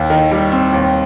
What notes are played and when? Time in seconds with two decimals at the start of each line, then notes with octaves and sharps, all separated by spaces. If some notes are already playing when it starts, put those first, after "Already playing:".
Already playing: D#2
0.10 D#3
0.31 G3
0.52 C4
0.73 D#2